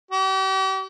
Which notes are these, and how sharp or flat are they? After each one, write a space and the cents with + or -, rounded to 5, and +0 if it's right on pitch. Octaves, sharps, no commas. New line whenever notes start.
G4 -40